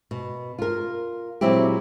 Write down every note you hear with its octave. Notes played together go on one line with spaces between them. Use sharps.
B2
F4 A#4
A#2 F#3 G#3 C4 E4 G4